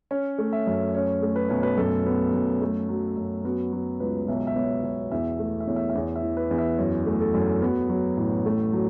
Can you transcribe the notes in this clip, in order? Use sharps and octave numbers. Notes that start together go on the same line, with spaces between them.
C#4 C#5
A3
E5
F#2
C#4 C#5
A3
B4
B1 C#5
B4
F#2 A4
B3
F#2
A3
F#3
F#2
B3 F#4
F#3
C#2 B4
B1 E5
E5
B3 C#5
B1 C#5
E2 E5
A3
E5
E2 C#5
E5
E5
E2 C#5
E5
E3
B4
E2
E5
F#2 C#5
A3
A4
F#2
B3 F#4
F#3
A1
A3
F#3